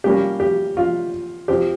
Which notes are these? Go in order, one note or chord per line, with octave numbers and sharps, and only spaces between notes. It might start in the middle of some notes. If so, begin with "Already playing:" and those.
A#2 G3 A#3 C#4 G4
G4
F4
F3 C4 G4